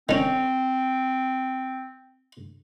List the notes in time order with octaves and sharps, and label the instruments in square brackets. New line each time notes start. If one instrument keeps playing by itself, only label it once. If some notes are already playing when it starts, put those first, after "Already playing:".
[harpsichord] D#3 C#4 [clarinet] C4